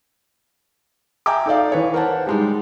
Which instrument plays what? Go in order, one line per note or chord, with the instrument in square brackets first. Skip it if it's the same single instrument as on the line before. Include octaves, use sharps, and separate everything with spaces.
[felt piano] E5 G5 G#5 A#5 D6
D#4 A4 D5 F5
E3 B4 C#5
A#4 C5 F#5 A5
G3 G#3 D#4